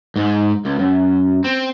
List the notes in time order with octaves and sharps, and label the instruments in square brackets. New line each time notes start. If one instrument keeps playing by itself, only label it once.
[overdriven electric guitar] G#2
C#2
F#2
C4